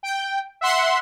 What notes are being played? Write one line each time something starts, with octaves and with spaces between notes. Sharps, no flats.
G5
E5 F#5 C6